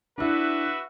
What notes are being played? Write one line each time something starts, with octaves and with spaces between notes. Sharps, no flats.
D4 E4 F#4 B4 E5